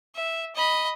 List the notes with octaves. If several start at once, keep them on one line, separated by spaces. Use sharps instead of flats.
E5
D#5 B5